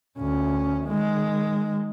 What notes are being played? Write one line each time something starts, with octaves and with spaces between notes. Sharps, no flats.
D2 C#4
D#3 G#3